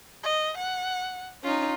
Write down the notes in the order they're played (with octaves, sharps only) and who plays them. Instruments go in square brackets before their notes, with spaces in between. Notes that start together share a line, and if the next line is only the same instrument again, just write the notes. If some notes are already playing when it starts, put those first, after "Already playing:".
[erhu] D#5
F#5
[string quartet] C#4 D#4 [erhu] F4